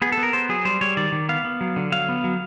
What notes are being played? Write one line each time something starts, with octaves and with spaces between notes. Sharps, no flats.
B3 G#4
A4
B3
A#4
B3 C5
F#3 G#4
G3 C5
G3 C#5
D#3 D5
D#3
B3 F5
B3
F#3
D3
F#3 F5
B3
F#3